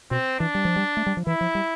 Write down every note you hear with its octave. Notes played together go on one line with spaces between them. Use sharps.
B2 C4
E3 D4
G3
F3
G3
A3
G3
F3
E3 E4
F3
G3